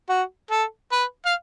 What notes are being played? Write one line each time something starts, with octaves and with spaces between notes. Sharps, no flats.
F#4
A4
B4
F5